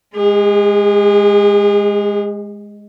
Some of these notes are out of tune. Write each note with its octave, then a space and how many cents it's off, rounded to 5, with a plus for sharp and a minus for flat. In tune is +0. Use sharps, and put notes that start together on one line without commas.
G#3 +0 G#4 -45